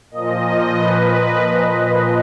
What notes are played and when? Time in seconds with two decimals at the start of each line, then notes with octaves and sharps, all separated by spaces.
0.11 A#2 F3 D#5
0.72 B4